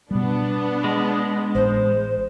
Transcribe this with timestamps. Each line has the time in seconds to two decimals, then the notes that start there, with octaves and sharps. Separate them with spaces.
0.11 B2 G3 B3 D4
0.84 G#3
1.55 A1 C5